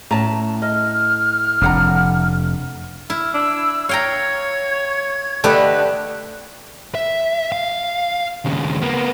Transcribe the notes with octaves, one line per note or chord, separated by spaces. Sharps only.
A2 C#4 A5 A#5
D#5 F6
F1 D4 F#5 A#5
E4 F6
D4 E6
C#5 F5 G5 A#5 G#6
D3 A3 G4 B4 D#5
E5
F5
D#2 C#3
A#3 B3